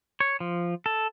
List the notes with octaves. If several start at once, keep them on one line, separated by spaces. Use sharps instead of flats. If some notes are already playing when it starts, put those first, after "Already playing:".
C#5
F3
A4